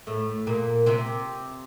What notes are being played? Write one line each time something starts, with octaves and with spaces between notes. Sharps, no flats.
A2 A3
A#2 A#3
C3 C4